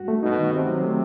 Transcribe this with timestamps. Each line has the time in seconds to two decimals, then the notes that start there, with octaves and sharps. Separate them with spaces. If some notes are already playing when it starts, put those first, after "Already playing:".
Already playing: G2 F#4
0.08 A3
0.23 B2 D#4
0.38 D#3
0.53 C3 C4
0.68 F#3
0.83 A3